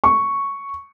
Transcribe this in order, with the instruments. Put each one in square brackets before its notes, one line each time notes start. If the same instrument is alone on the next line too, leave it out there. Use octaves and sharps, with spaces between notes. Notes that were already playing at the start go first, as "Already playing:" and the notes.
[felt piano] C#6